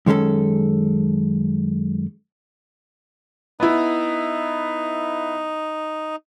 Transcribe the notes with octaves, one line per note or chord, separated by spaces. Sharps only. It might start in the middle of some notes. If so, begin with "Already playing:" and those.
F#2 D#3 G#3 C#4 A4
B3 D#4 E4